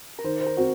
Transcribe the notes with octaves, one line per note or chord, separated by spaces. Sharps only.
A#4
D#3 C5
C5
A#4
C4 F#4